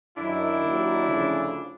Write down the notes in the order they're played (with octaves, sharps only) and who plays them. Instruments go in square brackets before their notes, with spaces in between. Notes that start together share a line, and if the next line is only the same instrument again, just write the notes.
[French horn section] F#2 D#3 F#3 [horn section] D4 E4
[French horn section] D#2 D#3 F#3
D2 C#3 F3